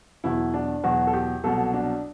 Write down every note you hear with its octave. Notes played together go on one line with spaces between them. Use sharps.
E2 B2 F#3 E4
D4
E2 B2 F#3 F#4
A4
G4
C2 B2 F#3 A4
D4